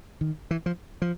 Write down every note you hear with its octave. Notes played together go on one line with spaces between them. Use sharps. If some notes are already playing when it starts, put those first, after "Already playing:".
D#3
E3
F3
F3